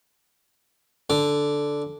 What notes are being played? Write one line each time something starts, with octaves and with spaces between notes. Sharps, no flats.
D3